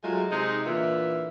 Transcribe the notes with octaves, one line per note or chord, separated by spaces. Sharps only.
F#3 G#3 A3 F4 G#4
C3 G#3 D#4
A#2 D3 E3 F4 E5